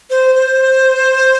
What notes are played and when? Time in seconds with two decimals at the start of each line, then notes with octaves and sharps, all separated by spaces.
0.10 C5
0.35 C5